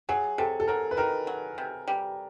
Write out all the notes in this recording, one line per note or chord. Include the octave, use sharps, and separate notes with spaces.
F#3 G#4
C3 A4
A4
F#3 A#4
B4
D#3 A#4
F#3
C3
G3